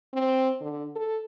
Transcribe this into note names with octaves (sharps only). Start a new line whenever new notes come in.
C4
D3
A4